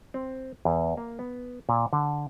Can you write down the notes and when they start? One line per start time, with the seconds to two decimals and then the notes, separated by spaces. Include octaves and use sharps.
0.14 C4
0.65 E2
0.97 A#3
1.19 B3
1.69 A#2
1.93 D3